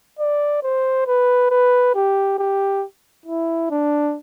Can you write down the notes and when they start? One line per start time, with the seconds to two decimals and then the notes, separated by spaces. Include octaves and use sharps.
0.19 D5
0.63 C5
1.07 B4
1.51 B4
1.95 G4
2.38 G4
3.26 E4
3.71 D4